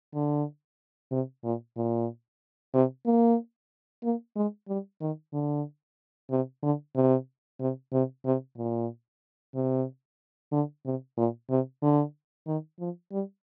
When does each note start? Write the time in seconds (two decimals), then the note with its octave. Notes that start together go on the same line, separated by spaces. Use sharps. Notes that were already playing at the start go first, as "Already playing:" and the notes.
0.14 D3
1.11 C3
1.44 A#2
1.77 A#2
2.74 C3
3.06 A#3
4.03 A#3
4.36 G#3
4.68 G3
5.00 D#3
5.33 D3
6.30 C3
6.62 D3
6.95 C3
7.60 C3
7.92 C3
8.25 C3
8.57 A#2
9.54 C3
10.52 D3
10.85 C3
11.17 A#2
11.50 C3
11.82 D3
12.47 D#3
12.79 F3
13.12 G3